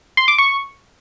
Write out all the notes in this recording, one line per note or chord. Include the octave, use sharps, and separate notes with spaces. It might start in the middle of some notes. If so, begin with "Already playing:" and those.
C6
D6
C#6